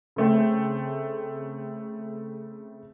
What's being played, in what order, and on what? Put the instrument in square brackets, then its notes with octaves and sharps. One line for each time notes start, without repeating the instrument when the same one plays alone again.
[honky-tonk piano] C#3 A3 C4